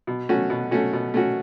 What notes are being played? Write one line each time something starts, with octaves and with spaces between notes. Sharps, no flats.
B2
A3 C#4 F#4
B2
A3 C#4 F#4
B2
A3 C#4 F#4